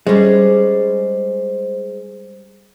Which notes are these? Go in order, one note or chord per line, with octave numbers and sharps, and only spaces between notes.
G3 G#3 C#4 C5